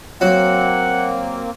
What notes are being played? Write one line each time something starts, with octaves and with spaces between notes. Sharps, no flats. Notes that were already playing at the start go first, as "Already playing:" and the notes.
F#3 A#3 C4 F#5